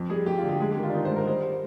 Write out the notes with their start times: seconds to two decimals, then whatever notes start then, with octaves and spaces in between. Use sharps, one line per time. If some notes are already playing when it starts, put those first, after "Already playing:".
Already playing: F2
0.10 G3 G#4
0.26 F2 G4
0.38 F4
0.43 D3
0.49 G4
0.60 G#3 G#4
0.71 G4
0.77 D#3
0.83 F4
0.89 D4
0.94 D#3 D#4
1.05 C5
1.11 G#2
1.16 A#4
1.27 G3 C5